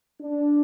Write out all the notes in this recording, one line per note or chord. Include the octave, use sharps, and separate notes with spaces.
D4